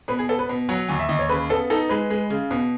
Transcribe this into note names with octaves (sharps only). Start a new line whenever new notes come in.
B2 B4
G#4
B3 A4
B4
B2
F#3 F#5
D#2 G#5
E5
D#2 D#5
C#5
C#3 B4
B3 A4
D#4 A4
G#3 B4
G#3
C#3
B2